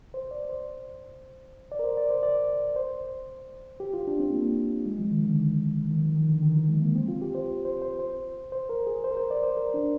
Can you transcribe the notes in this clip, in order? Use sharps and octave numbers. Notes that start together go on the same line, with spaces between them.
C5
D5
C5
D5
A#4
C5
D5
C5
D5
C5
G4
F4
D4
C4
A#3
G#3
F3
D#3
D3
D#3
F3
D#3
D3
D#3
F3
G#3
A#3
C4
F4
G4
C5
C5
C5
C5
C5
A#4
G#4
C5
A#4
C5
D5
C5
A#4
D4